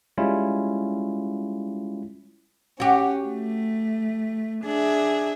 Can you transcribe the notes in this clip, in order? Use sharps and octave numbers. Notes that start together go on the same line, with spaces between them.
G3 G#3 C#4 E4 F4
C#4 F#4 G4
A3
D4 G#4 E5